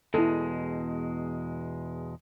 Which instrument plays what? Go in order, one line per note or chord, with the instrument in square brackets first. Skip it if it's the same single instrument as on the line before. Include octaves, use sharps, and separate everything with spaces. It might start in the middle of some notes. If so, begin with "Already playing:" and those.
[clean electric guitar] E2 B2 G#3 [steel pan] E4 A4